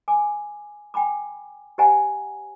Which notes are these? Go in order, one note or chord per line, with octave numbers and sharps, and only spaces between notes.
G#5 D6
G5 G#5 B5 D6
G4 C5 D#5 F#5 G#5 A#5